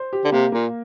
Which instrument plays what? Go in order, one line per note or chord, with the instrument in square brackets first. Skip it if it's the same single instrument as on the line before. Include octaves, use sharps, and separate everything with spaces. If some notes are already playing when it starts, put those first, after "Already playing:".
Already playing: [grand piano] C5
G4
[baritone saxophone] D3
[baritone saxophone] C3 [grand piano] A#3
[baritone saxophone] A#2 [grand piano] A#3